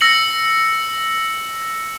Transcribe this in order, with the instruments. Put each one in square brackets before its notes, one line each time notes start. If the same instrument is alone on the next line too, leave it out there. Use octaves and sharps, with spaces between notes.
[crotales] E6 A#6 C#7 F#7